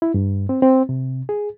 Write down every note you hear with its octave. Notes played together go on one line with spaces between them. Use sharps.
E4
G2
C4
C4
C3
G#4